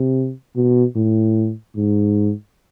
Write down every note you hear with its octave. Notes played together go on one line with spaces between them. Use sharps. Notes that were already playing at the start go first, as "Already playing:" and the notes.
Already playing: C3
B2
A2
G#2